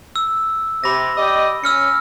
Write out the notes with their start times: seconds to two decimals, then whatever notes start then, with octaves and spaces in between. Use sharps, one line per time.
0.16 E6
0.84 C3 B5 A#6
1.17 G4 D5 D#5
1.64 C#4 E6 F6 C#7